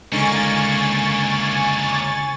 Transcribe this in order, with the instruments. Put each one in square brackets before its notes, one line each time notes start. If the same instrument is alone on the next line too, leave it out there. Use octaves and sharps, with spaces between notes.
[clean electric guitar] C#2 D3 D#4 [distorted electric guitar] A#3 C#4 [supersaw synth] G#5 C#6 A6